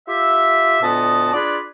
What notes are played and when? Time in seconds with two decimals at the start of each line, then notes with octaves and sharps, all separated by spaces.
0.08 F4 G4 E5
0.82 D2 A#2 B3 D#5 A5
1.33 D4 F4 G#4 B4 D5